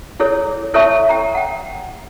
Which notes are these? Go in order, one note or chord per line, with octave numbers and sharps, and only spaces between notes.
E4 G#4 A4 C#5
E4 A4 C#5 E5 A5 C#6
G5 A#5
F#5 G5